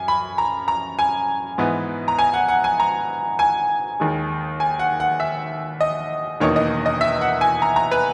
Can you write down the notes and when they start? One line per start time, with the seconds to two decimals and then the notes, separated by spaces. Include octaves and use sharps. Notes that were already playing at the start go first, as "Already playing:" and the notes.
Already playing: F#2 G#5
0.08 B5
0.38 A#5
0.68 A#5
0.99 G#5
1.58 G#2 E3 B3 D#4
2.08 A#5
2.19 G#5
2.34 F#5
2.48 F#5
2.64 G#5
2.80 A#5
3.39 G#5
4.00 D#2 D#3 G#3
4.60 G#5
4.79 F#5
5.00 F#5
5.20 E5
5.81 D#5
6.40 E1 E2 D#3 A#3 D#4 C#5
6.56 D#5
6.86 D#5
7.01 E5
7.21 F#5
7.41 G#5
7.62 A#5
7.76 A#5
7.91 B4